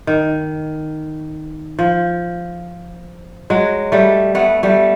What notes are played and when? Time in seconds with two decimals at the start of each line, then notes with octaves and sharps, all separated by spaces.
0.07 D#3
1.79 F3
3.50 F#3 G#3
3.92 G3 A3
4.35 A3 B3
4.63 G3 A3